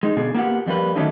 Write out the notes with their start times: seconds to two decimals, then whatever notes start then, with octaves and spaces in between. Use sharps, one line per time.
0.03 G#3 D#4
0.17 B2 D3 G#4
0.35 A#3 B3 F4 G4 F#5
0.66 F2 G3 A#3 B4
0.96 D3 D#3 F#3 A3 C#4 D#4